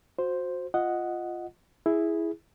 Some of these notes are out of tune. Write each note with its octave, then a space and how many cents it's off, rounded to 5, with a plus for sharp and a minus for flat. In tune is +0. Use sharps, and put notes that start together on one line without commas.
F#4 -25 C5 +0
F4 +0 D#5 +0 F#5 +0
E4 +0 G#4 +0